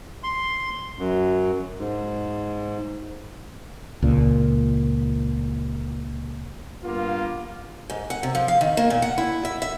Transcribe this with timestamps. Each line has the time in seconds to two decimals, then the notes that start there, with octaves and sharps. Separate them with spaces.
0.23 C6
0.99 F#2
1.79 G#2
4.03 C#2 A#2
6.84 G2 A#3 B3 F4
7.90 G#2
8.10 F#5
8.23 C3
8.35 F3
8.48 F5
8.61 D#3
8.77 A#3
8.90 A#2
9.02 F#5
9.18 E4
9.45 E5
9.62 E5